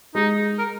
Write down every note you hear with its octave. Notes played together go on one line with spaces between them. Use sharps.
G#3 D#4
A#4